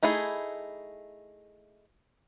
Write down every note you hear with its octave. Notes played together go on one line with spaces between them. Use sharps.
A3 D#4 E4 G#4